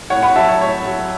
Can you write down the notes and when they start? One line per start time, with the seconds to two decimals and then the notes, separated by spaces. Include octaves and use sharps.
0.10 A2 C#5 F#5
0.23 F#5 B5
0.35 F#3 E5 A5
0.48 C#5
0.61 A2 C#5
0.86 F#3